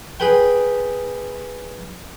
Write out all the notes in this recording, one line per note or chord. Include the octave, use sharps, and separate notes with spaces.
G#4 B4 G5